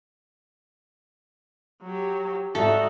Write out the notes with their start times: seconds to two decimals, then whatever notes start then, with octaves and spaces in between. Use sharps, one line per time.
1.83 F#3 G4
2.55 G#2 D#4 F#4 A4 E5